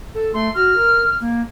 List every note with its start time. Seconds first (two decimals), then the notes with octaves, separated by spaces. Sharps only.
0.14 A4
0.34 A3 C6
0.55 F#4 F6
0.76 A#4
1.20 A#3